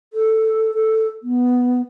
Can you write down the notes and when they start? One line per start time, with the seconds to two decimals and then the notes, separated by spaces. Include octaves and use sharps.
0.13 A4
0.74 A4
1.23 B3